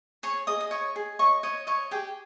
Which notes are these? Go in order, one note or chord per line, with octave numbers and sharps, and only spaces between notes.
G#4 C#5 C#6
G#4 D#5 D#6
D#6
C#5 D#5 C#6
G#4
C#5 D#5 C#6
C#5 D#5 C#6
C#5 D#5 C#6
G4 G#4 G5